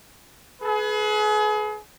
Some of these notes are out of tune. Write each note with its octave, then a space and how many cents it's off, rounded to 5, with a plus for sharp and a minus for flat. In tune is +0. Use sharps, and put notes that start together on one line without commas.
G#4 +35 B4 +0